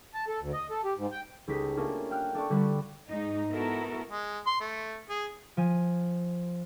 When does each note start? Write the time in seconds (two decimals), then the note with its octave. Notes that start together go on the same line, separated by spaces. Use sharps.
0.14 A5
0.28 A4
0.40 D2
0.53 D#5
0.70 A4
0.84 G4
0.98 G#2
1.12 G5
1.47 C#2 D#4 G4 A4 B6
1.77 A3 A#3 C#4 D4 F4
2.10 F5 G5 F6 F#6
2.35 D4 A4 D5 C#6
2.50 D3 G3 D4 F#4 B4
3.09 G#2 D#4
3.50 B3 E4 F#4 A4 A#4
4.11 G#3
4.47 C6
4.61 A3
5.10 G#4
5.57 F3 G#5